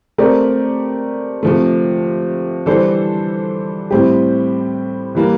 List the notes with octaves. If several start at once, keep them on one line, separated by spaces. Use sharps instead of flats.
A3 C4 G4 A#4 D5
C3 F3 A3
E3 G3 D4 A4 C5
A2 G3 C4 E4 G4
E3 G3 A#3